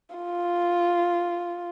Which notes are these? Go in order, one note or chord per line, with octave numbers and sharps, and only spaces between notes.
F4